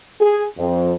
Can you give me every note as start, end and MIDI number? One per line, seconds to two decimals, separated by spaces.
0.20 0.44 68
0.58 0.93 41